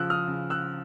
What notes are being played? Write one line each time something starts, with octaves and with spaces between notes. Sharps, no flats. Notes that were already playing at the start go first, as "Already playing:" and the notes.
Already playing: C#3 F3 E6 F#6
D#6 F6
C#3
E6 F#6